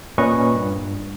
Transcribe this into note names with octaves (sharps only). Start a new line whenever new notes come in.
A#2 C#4 B4 D#5 C#6
G2